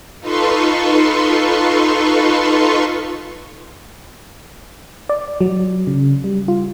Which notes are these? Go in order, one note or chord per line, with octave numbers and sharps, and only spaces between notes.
D#4 F4 A4 B4 C6 C#6
D5
F#3
C#3
G3
F4